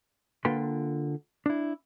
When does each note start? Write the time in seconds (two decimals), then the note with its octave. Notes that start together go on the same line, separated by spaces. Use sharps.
0.45 D3 A#3 F4 B4 G5 C6
1.46 D4 E4